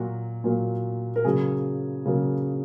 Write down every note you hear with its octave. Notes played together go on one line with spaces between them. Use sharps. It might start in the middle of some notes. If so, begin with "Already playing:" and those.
Already playing: A#2 F#3 A#3 F#4
A#2 F#3 A#3
A#4
C#3 F#3 A#3 G#4
C#3 F#3 A#3